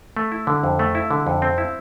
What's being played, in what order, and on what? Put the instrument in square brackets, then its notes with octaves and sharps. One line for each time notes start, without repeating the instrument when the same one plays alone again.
[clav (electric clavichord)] A3
E4
D3
F2
A3
E4
D3
F2
C4
E4